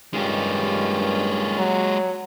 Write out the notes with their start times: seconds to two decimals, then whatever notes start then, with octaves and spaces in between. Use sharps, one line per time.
0.14 G2 D#3 G#3 C#4 F4 G4
1.58 F#3